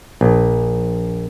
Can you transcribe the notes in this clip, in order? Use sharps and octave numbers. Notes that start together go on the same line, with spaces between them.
A#1